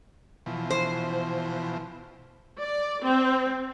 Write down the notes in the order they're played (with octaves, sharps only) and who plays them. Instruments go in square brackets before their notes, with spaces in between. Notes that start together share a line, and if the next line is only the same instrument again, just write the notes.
[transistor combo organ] B2 E3 F3
[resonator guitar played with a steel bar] C5
[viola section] D5
C4